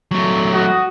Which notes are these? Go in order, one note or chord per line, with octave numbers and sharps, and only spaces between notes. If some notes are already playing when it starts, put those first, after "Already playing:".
F#3 A3
F#4 D#6